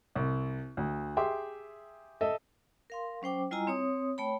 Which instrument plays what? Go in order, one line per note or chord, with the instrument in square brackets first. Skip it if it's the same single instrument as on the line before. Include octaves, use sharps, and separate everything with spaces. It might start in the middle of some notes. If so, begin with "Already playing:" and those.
[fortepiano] C2
D2
G4 G#4 E5 G5 C6
A4 D#5 E5
[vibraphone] A#4 F5 C6
F#3 C#4 C5 G5 D6
G3 E4 F4 D#5 G#5 A#5
C4 C#5 D#6
A3 C#5 G5 B5